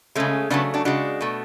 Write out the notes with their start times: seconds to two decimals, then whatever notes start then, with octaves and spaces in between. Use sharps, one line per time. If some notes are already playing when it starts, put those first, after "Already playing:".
0.15 C#3 G#3 A3 C#4
0.50 C#3 F#3 A3 B3 D4
0.74 D4 F#4
0.85 C#3 G#3 D4 F#4
1.21 B2 A3